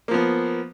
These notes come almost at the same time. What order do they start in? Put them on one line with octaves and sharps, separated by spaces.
A#3 F3 B3